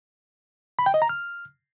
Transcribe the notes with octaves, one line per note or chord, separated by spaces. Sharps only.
B5
G5
D#5
A#5
F6